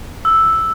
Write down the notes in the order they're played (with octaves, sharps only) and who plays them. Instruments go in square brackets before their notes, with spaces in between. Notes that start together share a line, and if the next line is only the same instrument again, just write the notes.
[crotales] E6